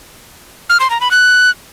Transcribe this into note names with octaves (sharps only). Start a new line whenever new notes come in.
F6
C6
A#5
B5
F#6